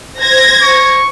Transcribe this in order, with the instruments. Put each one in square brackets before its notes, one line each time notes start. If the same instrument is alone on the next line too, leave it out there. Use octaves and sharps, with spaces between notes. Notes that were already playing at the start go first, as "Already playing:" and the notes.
[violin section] C5 G#6 A#6
[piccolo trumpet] C#6